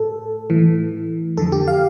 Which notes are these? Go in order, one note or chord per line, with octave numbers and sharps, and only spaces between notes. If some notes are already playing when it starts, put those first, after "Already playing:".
Already playing: A2 A4
A2 E3
F2 D3 F3 A4
G4
F5